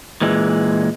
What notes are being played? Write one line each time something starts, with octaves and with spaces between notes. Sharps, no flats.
A#2 E3 G#3